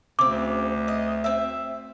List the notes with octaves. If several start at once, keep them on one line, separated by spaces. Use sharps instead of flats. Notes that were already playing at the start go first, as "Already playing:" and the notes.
D2 C#3 C4 D6
D#5
C4 E5